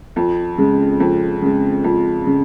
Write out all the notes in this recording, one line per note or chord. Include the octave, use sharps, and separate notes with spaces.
F2
C#3 G#3
F2
C#3 G#3
F2
C#3